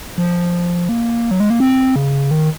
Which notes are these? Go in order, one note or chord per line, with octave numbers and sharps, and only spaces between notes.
F3
A#3
F#3
G#3
A#3
C4
C#3
D#3